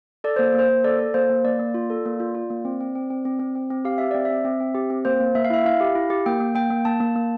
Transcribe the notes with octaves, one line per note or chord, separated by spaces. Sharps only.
A4 D5
A#3 C5
A#3 C5
A#3
A4 D5
A4
A#3 C5
A#3
A#3 D5
A#3
F4
A4
A#3
F4
F4
A#3
C4
C4
C4
C4
C4
C4
C4
C4
G4 F5
G4 E5
C4 D5
E5
C4
C4
C4
G4
C4
A#3 C5
A#3
A#3 E5
F5
E4 E5
E4 F5
G4
E4
G4
A#3 G5
A#3
A#3 G5
A#3
A#3 A5
A#3
A#3